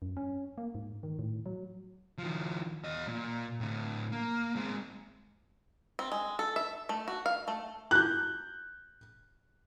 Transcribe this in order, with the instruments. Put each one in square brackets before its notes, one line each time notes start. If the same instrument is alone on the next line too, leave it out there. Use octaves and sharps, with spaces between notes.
[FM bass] F#2
C#4
A#3
G#2
D#3
A2
F#3
[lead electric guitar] D#3 F3
E2 D#5
A#2
A2 D3
A#3
G#3 C4
[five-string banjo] C4
G#3
A4
E5
A3
F#4
F5
A3
[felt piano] F#6 G6